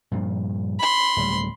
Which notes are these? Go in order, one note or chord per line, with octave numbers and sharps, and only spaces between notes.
G2 A#2 F3
B5 C6
D1 D2 G3